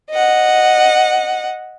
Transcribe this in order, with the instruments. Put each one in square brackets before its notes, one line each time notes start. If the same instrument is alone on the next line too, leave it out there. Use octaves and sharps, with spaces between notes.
[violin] D#5 F#5